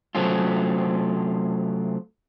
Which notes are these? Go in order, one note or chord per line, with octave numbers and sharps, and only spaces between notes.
C3 F#3 A3 C4 C#4 F4